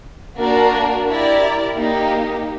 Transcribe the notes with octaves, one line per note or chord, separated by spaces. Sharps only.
A#3 D4 F#4 A#4
E4 G4 A#4 D5
A#3 D#4 G4